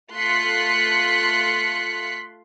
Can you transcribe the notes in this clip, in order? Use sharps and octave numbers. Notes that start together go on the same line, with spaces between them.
A3 F4 C6 F#6 B6 C#7